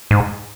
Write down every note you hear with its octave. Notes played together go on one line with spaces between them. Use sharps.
G#2